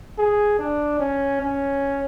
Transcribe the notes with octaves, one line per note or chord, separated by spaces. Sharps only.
G#4
D4
C#4
C#4